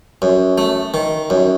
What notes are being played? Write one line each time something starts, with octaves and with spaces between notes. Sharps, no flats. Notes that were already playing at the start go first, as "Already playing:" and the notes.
F#2
A3
D#3
F#2